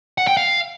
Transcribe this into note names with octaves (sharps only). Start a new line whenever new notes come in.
F#5
G5
F5